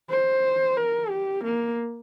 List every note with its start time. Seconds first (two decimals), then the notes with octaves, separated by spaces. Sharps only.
0.10 C5
0.77 A#4
1.10 G4
1.44 A#3